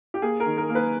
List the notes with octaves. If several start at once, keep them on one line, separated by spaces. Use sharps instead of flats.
G4
A#3 G#4
A#4
D#3
A#4
A#3
B4